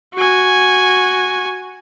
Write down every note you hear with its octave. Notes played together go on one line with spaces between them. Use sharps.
F#4 G#5